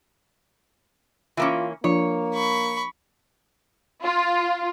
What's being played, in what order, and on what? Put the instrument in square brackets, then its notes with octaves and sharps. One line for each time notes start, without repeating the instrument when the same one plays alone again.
[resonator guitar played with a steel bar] E3 A#3 C#4 [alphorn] F4
[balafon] F3 D4 F4 [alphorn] A#3 [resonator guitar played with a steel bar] C#5
[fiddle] B5 C#6
[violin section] F4